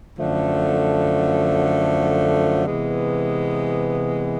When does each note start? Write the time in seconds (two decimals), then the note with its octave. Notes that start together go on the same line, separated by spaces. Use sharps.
0.17 F#2 D3 F3 A3
2.66 C3 E3 G#3 B3